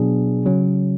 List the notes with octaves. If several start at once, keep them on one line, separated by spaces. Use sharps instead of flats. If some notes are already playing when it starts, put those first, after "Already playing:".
Already playing: B2 F#3 B3 D4 G#4
C#3 F#3 C#4